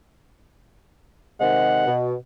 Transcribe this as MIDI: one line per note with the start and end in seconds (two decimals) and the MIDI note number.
1.41 1.84 48
1.41 1.84 51
1.41 1.84 56
1.41 1.93 78
1.87 2.13 47